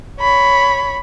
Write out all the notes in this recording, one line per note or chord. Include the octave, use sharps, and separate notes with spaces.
C#5 B5